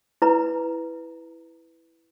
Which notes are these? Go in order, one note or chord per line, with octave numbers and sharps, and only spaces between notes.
E4 B4 A#5